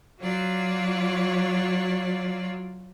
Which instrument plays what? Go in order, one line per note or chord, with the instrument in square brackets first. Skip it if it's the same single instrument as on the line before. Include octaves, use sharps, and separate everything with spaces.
[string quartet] F#3 F4 F#4 C#5 D5